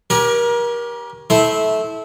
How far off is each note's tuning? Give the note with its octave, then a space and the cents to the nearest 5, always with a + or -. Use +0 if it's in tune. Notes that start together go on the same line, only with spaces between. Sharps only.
C#4 +0 G4 +0 A#4 +30
A3 -15 E4 -20 C5 +0